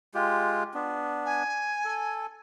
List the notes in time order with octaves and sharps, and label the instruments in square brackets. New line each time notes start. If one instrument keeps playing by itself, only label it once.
[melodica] G#3 F4 G4
B3 D4
[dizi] G#5
[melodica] A4